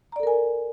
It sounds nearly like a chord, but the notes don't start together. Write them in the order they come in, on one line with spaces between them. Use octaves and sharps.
A#5 D5 A4 A#4 G#5